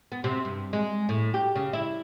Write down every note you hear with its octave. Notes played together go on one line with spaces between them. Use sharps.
B3
C3
G2
G#3
A2
G4
C#3
E4